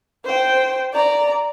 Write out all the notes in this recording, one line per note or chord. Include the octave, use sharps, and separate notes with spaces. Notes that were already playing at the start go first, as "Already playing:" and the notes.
C5 G5
D5 A#5